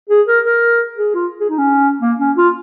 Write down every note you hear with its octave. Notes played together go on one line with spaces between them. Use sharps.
G#4
A#4
A#4
G#4
F4
G#4
D#4
C#4
A#3
C#4
F4